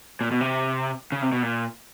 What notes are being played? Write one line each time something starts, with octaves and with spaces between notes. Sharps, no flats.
A#2
B2
C3
C#3
C3
B2
A#2